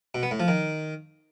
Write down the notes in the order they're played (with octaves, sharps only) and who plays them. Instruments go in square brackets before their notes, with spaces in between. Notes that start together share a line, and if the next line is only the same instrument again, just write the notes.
[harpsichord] B2
B3
A2
F3
D#3